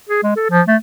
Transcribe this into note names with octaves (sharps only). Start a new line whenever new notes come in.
G#4
G#3
A4
F3
A3